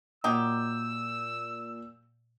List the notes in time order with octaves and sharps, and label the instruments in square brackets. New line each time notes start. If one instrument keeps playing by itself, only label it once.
[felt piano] A#2 [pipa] F#3 D#4 G4 [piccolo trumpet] E6